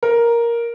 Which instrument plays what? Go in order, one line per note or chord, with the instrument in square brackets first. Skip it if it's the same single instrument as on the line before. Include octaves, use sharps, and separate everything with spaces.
[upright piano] A#4